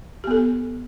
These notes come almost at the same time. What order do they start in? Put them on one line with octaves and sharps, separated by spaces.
G4 B3 A4